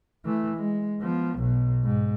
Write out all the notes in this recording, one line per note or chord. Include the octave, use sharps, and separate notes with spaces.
E3 A3
G#3
F3 B3
B1 B2
G#2